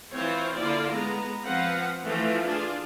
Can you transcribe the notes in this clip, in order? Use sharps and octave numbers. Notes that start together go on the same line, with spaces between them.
E3 C4 F4 C5 C#5
D3 A#3 E4 F4 D5
G#3 B3 A#5
F3 C4 B4 F5 F#5
E3 F3 A3 F4
D4 F4 G#4